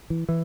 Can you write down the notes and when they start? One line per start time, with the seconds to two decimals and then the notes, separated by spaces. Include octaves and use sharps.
0.10 E3
0.29 E3